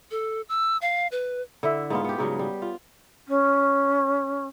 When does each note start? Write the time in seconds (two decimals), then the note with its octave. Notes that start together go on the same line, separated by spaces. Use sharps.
0.11 A4
0.49 E6
0.82 F5
1.12 B4
1.63 D3 E4 E5
1.90 G#2 B3 F4
2.04 B3 G4
2.18 G#2 C#3 F#3 G3
2.39 G3
2.62 F4
3.27 C#4